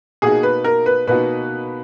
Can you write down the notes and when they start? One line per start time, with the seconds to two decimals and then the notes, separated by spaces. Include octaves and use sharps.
0.22 B2 A#3 D#4 F#4 G#4
0.43 B4
0.64 A#4
0.86 B4
1.07 B2 A#3 D#4 F#4 B4